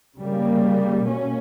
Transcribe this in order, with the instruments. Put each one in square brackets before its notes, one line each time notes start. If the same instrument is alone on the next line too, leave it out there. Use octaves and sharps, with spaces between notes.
[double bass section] C#3 G3 A#3
B2 A#3 C#4